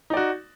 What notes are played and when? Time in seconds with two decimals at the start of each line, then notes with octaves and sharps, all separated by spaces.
0.10 D#4
0.14 D5
0.17 F#4